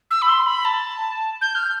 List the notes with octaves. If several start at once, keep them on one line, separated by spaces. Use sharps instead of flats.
E6
B5
C6
B5
A5
G6
F6